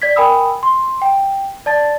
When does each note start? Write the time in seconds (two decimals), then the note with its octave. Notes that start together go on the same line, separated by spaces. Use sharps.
0.02 D5 G#6 B6
0.16 A#4 G5 G#5 B5 D#6 E6
0.63 C6
1.02 G5
1.66 D5 A5 A6